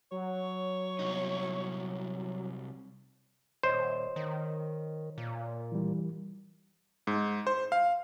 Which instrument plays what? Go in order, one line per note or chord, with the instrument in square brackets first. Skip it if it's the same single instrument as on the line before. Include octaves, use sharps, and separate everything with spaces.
[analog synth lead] F#3 [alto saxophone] C#5
[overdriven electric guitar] C2 D#4
[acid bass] D#1 [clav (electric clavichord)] C5 [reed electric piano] C#5 D#5
[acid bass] D#3
A#2
[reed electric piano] E3 G3
[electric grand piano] G#2
C5
F5